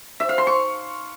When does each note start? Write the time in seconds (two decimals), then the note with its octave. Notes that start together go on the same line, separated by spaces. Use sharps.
0.20 E5
0.29 F5
0.38 C6
0.47 C#6